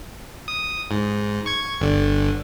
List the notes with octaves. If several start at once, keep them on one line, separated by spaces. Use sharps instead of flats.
D#6
G#2
C#6 G#6
G1 D3